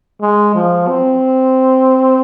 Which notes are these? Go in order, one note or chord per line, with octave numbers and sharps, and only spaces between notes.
G#3
F3
C4